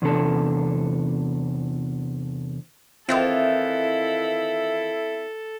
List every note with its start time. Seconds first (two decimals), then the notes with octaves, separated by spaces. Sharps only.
0.02 E2 C3 D4 A4 A5
3.09 D#3 E3 C4 E4 F4 A4